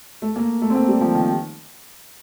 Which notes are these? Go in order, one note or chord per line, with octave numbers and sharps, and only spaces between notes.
A3
A#3
A3
C4
A#3
G3
F3
D#3